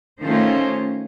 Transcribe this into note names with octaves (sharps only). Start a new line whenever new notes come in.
D#3 A3 C#4 F4 C5